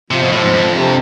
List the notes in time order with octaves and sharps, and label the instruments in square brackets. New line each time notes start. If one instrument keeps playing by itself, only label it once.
[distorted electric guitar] C3 [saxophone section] F3
[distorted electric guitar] B2
[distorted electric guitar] A2 [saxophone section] F3
[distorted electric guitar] G#2
[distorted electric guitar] F2 [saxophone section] D4
[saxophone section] C3